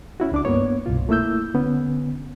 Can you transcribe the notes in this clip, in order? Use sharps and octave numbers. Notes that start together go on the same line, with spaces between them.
C#4 E4 F#4
C#2 D4 D6
G2 A#3 B3 C#5
C2 G2 B2 F4
A3 A#3 E4 E6 G6
D3 B3 C#4